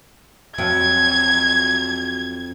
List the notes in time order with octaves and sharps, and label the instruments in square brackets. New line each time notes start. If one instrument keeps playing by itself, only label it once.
[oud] F2 F#3 [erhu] G#6